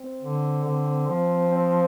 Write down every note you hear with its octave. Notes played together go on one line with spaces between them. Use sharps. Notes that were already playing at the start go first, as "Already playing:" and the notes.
Already playing: C4
D3
D3
F3
C4